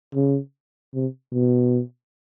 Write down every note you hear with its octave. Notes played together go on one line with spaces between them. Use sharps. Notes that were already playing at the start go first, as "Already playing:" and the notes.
C#3
C3
B2